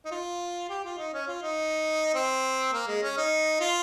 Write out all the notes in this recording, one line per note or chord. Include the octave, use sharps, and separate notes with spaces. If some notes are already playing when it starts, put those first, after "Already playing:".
D#4
F4
G4
F4
D#4
C#4
F4
D#4
C4
A#3
G#3
C#4
D#4
F4